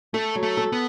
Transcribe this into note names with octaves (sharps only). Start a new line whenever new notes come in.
A3 A4
F#3
A3
A4
B3